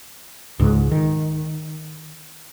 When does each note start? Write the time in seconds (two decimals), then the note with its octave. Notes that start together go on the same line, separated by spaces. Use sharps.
0.60 C#2 G#2
0.92 D#3